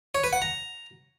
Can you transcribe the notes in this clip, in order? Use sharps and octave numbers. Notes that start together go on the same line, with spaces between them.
C#5
B4
F#5
A#5